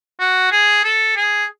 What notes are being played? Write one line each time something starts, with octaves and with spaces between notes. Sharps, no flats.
F#4
G#4
A4
G#4